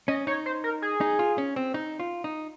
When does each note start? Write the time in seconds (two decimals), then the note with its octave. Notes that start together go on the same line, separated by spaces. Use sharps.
0.08 C#4 D#5
0.27 D#4 C#5
0.46 C5
0.64 A#4
0.82 G#4
1.01 D#4
1.19 F4
1.38 C#4
1.56 C4
1.74 D#4
2.00 F4
2.24 D#4